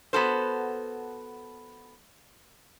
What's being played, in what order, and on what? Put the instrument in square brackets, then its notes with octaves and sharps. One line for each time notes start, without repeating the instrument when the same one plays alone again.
[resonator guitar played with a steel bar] B3 F#4 A4 C5